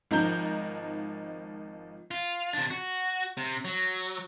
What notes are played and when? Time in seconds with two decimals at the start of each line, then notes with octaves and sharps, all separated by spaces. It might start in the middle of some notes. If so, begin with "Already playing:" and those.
0.11 G#1 F3 D#4 A#5 G6
2.11 F4
2.53 C3 D4
2.71 F#4
3.37 C3
3.65 F#3